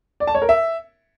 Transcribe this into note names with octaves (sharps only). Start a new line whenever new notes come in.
D5
A5
C#5
A#4
E5